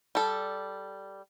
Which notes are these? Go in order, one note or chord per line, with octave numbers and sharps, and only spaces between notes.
G3 A4